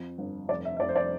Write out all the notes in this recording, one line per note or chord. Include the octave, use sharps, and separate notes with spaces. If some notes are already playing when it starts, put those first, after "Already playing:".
Already playing: F2
G1
F1 D5
E5
E5
F1 D5
C5
D5